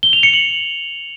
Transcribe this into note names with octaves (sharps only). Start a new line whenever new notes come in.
G7
F7
C#7
F#7